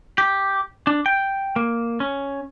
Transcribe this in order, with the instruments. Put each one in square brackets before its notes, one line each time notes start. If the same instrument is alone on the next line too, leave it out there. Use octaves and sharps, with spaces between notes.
[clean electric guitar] G4
D4
G5
A#3
C#4